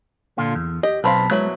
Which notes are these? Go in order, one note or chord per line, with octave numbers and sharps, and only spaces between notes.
A#2 D3 F4
E2
G4 D#5
B1 B3 C4 F5 A5 B5
F#3 G#3 B3 E4